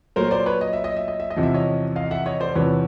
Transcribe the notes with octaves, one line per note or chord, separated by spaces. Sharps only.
A#2 F#3 A#4 C5
C5 D5
B4 C#5
D#5
E5
D#5
E5
D#5
E5
D#5
E2 C3 F3
E5
C#5 D#5
D#5 F5
E5 F#5
C#5 D#5
C5 D5
E2 C3 F3 B4 C#5